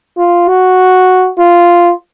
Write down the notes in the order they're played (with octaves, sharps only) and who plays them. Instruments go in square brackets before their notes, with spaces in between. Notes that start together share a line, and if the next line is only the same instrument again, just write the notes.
[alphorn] F4
F#4
F4